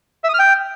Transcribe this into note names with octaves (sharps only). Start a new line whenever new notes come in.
E5
D#6
F6
G5